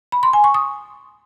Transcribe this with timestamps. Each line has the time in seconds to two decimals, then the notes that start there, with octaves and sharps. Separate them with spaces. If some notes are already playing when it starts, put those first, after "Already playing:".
0.12 B5
0.23 C6
0.33 G#5
0.44 C#6
0.54 D#6